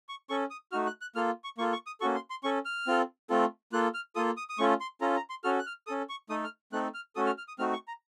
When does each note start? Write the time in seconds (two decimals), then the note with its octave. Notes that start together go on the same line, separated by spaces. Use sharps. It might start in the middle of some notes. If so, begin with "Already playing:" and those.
0.09 C#6
0.29 C#4 A4 C#6
0.50 D#6
0.72 A3 D#4 F#4 F6
0.87 F#6
1.01 F#6
1.15 A#3 F4 A4 F6
1.44 C#6
1.58 A#3 F4 A4 C#6
1.73 C#6
1.86 D#6
2.01 A#3 C#4 F#4 A4 C#6
2.15 C6
2.30 C6
2.43 C#4 A4 C#6
2.65 F6
2.87 C4 F4 A4
3.30 A3 C4 F4 A4
3.73 A#3 F4 A4 F#6
3.94 F6
4.15 A#3 F4 A4 D#6
4.37 D#6
4.49 D#6
4.58 A3 C#4 F4 A4 C#6
4.80 C6
5.01 C#4 F4 A4 A#5
5.16 A#5
5.30 C6
5.44 C#4 F#4 A4 F6
5.59 F#6
5.66 F6
5.87 C#4 A4 D#6
6.09 C#6
6.30 A3 D#4 A4 D#6
6.44 F6
6.73 A3 C4 D#4 A4 F#6
6.94 F6
7.16 A3 C#4 F#4 A4 D#6
7.27 F6
7.38 F6
7.48 D#6
7.59 A3 C4 D#4 F#4 F6
7.73 C#6
7.88 A#5